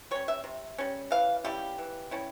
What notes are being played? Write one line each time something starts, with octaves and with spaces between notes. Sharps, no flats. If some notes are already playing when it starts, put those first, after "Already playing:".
G3 C#4 C#5
E5
C3
G3 C#4
E3 F5
G3 C#4 E4 G4
E3
G3 C#4 E4